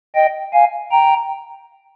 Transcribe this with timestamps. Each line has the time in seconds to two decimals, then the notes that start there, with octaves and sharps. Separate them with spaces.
0.15 D#5 G5
0.53 F5 G#5
0.91 G5 A#5